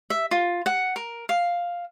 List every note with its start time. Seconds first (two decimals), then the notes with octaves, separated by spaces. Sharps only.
0.10 E5
0.31 F4
0.66 F#5
0.96 A#4
1.29 F5